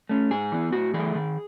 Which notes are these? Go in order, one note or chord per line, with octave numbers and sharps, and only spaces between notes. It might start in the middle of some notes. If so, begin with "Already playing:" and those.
A3 C#4
G#2 G#4
E3 B3
A2 F#4
E3 A3 G#4
D#3